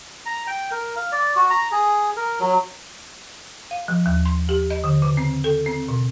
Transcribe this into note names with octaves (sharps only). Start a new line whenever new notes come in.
A#5
G5
A#4
F5
D5
F#4
A#5
G#4
A#4
F#3
F5
F3
D#2
C6
G4
D#5
D3
C#3
C4
A4
C4
B2